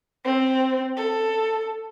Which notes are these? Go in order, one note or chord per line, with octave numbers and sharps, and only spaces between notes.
C4
A4